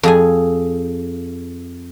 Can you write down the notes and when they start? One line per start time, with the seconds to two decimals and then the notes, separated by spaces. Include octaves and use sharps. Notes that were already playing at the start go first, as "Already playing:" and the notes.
0.03 F2 G#4 G#5